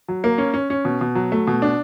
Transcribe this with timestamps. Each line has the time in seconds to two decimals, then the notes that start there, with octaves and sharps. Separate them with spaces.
0.08 F#3
0.24 A#3
0.38 C#4
0.54 C#4
0.70 C#4
0.85 B2
1.01 B2
1.15 F#3
1.32 A3
1.47 B2
1.62 D4